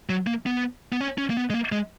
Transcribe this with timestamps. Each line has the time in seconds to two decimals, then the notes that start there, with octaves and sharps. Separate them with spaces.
0.09 F#3
0.27 A#3
0.46 B3
0.92 B3
1.01 C#4
1.18 C#4
1.30 A#3
1.37 B3
1.50 G#3
1.54 A#3
1.72 G#3